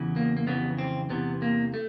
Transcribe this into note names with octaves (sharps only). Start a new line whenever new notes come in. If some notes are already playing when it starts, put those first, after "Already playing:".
Already playing: E2 C#3 E3
A#3
A#3
F2 C#3 E3 B3
C4
E2 C3 E3 B3
A#3
A3